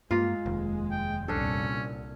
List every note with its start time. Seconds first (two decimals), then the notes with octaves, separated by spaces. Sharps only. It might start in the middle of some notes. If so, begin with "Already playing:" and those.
0.11 G2 G#3 A#3 F4
0.46 F1 D#2
0.91 G5
1.28 C2 A#2 C#4 D4 A4